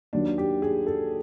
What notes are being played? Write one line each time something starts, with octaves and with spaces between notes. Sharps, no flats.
D#2 D#3 F#3 D4
G4
G#4
A4